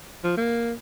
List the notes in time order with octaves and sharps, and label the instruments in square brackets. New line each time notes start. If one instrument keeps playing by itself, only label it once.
[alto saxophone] F3
A#3